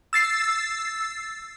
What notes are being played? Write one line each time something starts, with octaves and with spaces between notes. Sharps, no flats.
E6 A6 C7